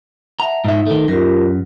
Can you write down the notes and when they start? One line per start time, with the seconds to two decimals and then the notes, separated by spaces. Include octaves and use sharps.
0.40 E5 F#5 A5 A#5
0.65 G#2 D#4 E5
0.87 D#3 A3
1.08 F#2 F4 G4 A#4